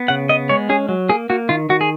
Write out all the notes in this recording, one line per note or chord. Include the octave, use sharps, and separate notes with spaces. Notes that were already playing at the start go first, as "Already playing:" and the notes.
Already playing: B3
C#3 F#5
B3 D#5
G#3 C#5
C#4 G#4
F#3
A#3 G#4
A#3 F#4
D#3 F4
D#3 F#4
G#4